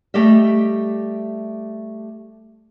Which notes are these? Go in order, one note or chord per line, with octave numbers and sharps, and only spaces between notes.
G3 A3 G4 D#5 E5